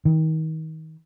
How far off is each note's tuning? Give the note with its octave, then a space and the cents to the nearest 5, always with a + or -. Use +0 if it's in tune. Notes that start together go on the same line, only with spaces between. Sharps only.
D#3 +30